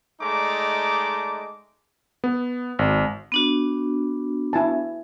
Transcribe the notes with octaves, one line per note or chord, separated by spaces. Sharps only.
G#3 A3 D#4 D5 A#5 D6
B3
G#1
B3 D4 F#4
E4 G#5 A5